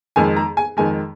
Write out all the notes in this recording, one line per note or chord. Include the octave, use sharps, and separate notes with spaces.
F2 D#3 G#3 G#5
A#5
G#5
F2 D#3 G#3 G#5